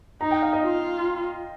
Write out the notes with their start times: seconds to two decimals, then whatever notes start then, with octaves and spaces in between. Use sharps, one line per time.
0.21 D#4 A#5
0.31 G5
0.42 F5
0.53 D#5
0.63 F4